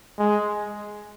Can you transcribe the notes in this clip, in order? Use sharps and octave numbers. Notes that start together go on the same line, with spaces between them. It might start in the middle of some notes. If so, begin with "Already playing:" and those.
G#3